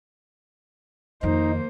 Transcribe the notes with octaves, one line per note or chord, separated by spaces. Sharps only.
F2 D#3 A#3 D#4 C5